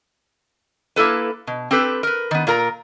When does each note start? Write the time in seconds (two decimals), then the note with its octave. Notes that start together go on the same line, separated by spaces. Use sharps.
0.96 A#3 E4 A4 B4
1.47 B2
1.71 C4 G4 A4 B4
2.03 A#4 B4
2.31 D#3 B3
2.47 A#2 F4 A#4 A#5